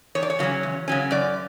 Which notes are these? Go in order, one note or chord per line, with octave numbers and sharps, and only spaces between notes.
E2 C#5
D5
C#5
C#3 F#3 C#4
E2
C#3 F#3 C#4
F#2 D5